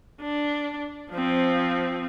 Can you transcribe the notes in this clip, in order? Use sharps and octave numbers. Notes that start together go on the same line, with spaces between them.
D4
F3 C4